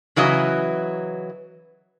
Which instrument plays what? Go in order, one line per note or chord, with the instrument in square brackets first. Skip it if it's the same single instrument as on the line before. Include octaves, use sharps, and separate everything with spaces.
[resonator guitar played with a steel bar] C#3 E3 F#3 D#5